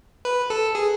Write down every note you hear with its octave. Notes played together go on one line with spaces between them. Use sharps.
B4
A4
G#4